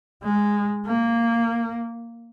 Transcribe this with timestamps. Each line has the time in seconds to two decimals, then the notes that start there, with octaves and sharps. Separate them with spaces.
0.24 G#3
0.86 A#3